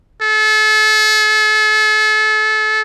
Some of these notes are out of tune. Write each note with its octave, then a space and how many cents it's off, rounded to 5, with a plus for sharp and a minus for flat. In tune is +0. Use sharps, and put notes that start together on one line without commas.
A4 -35